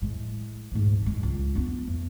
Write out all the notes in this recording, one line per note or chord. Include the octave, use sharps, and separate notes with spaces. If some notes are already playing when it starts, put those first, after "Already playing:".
A2 G#3
D2 G#2
D3 G#3
C#2
B3 D4
E2